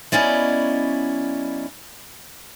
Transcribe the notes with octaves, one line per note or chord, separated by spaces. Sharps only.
F#3 B3 C#4 E4 D5 D#5